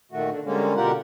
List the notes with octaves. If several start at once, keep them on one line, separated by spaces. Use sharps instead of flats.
A#2 D#3 A3 F#4
D3 D4
D3 G3 G#3 A#3 C#4
B2 D3 F4 G4 A#4 F#5